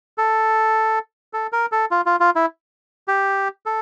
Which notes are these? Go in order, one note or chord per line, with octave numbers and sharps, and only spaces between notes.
A4
A4
A#4
A4
F4
F4
F4
E4
G4
A4